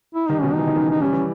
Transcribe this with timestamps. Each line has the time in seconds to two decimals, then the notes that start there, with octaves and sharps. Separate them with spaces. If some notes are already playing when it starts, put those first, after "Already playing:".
0.15 E4
0.28 D#3 G3 D#4
0.41 B2 D#3 C#4
0.54 E3 D#4
0.67 D#3
0.76 C#3 E3
0.90 D#4
1.02 G3 C#4
1.13 E3